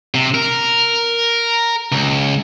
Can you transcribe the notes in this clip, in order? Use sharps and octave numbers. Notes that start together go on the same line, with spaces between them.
C3
A#4
C#2